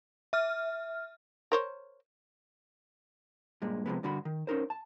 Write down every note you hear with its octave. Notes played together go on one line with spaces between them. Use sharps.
E5 F6
A#4 C5 C#5
G2 A#2 G#3
C3 F3 G#3 B3
G2 D3 F#4 B5
D#3
C#4 D#4 A#4 C5
A5